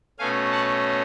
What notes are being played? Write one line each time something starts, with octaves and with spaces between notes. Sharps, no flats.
B2 A3 C#4 F5 G#5
F#5 A5